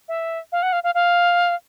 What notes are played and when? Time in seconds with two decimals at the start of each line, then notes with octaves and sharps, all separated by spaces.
0.08 E5
0.52 F5
0.62 F#5
0.72 F5
0.84 F5
0.95 F5